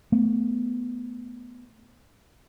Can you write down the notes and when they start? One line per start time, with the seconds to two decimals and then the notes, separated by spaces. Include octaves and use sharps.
0.12 A3 B3